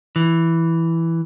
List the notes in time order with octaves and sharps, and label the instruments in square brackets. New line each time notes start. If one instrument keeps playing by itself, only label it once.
[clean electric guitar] E3